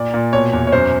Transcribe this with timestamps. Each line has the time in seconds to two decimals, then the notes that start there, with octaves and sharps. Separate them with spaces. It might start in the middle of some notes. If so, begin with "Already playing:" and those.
Already playing: A#2 D5
0.14 A#2
0.33 B2 C#5
0.53 E2
0.67 C#5
0.72 F#2 C5